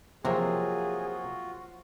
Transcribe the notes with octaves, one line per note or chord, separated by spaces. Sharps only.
C3 F3 F#3 A#3 F4 F#4 G#4